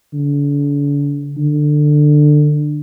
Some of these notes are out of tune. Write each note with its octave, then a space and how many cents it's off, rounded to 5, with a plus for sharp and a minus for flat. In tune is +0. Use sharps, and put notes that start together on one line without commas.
D3 -40
D3 +20